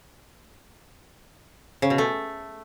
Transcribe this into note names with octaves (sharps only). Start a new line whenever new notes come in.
C#3
B2
A3